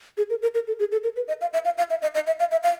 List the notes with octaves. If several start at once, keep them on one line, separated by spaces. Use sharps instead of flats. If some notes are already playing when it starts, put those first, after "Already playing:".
G#4
A#4
A#4
A#4
A4
G#4
A4
A#4
B4
D#5
F5
E5
F5
F5
E5
D#5
D#5
E5
F5
E5
F5